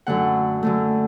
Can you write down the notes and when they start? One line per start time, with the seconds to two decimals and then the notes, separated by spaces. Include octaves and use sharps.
0.07 F#2 D3 A3 F#5
0.63 F#2 D3 A3